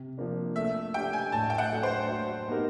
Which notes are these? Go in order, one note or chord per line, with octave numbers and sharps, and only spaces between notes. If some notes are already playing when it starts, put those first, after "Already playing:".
Already playing: C3
F3 A#3 D4
A3 E5
D4 G4 G5
G#5
A2 A5
G5
F#5
F#3 A3 D4
C5
F#3
B3 D#4 G4 A#4